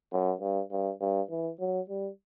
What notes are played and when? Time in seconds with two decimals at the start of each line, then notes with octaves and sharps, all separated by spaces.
0.12 F#2
0.41 G2
0.71 G2
1.00 G2
1.30 E3
1.60 F#3
1.89 G3